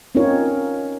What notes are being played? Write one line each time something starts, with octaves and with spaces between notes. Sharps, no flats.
C4 C#4 D#4 F4 A#4 C#5